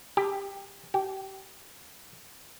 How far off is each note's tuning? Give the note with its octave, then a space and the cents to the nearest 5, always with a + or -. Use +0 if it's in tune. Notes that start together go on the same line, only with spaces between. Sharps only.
G4 +15
G4 -30